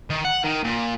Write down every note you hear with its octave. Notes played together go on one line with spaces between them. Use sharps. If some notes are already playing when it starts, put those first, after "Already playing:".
D#3
F#5
D#3
A#2